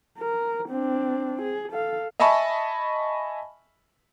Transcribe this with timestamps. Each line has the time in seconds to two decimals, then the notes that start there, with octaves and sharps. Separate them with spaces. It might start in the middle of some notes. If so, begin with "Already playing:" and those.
0.18 A#4
0.69 C4 D4
1.42 G#4
1.72 A4 F5
2.20 D#5 E5 G#5 A5 B5 C#6